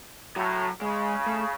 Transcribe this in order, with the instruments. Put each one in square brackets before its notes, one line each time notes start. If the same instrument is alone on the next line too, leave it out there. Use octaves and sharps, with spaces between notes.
[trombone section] A2 [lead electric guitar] F#3
[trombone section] C#3 [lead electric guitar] G#3
[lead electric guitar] A3